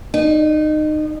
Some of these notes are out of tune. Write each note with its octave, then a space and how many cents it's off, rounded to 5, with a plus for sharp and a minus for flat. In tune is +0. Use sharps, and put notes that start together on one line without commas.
D#4 -25